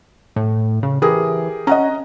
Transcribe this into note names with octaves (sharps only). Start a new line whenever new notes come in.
A2
C#3
E3 G4 G#4 A#4
C#4 D#5 F#5 A#5